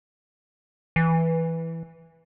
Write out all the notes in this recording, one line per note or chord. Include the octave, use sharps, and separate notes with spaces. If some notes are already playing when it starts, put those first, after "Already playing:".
E3